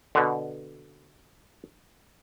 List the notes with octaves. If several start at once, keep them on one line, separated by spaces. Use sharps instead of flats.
B2 D3